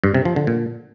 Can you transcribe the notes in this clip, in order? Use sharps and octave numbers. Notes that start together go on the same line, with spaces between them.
G2
C3
F3
D3
A#2